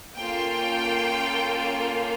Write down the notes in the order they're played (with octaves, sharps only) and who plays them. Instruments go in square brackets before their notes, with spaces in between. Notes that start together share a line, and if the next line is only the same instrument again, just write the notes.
[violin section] A#3 C#4 F4 A4 G5